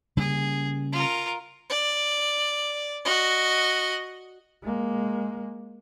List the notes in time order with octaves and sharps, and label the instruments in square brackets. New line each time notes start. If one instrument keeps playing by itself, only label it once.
[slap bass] C#3 G3 A#3 [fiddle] G#4
[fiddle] F4 A#4
[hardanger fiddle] D5
F#4 D#5
[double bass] G#3 A#3